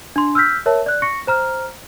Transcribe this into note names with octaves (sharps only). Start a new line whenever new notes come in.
D4 C6
E6 F6 G6 B6
A#4 C#5 E5 A5
D5 F#6
C#6 A#6 C#7
C5 A#5 F6